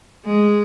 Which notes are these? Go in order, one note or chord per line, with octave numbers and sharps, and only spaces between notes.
G#3